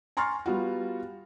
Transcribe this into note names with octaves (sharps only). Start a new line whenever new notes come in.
G#5 A#5 C6 C#6 F6 A6
G3 B3 F4 F#4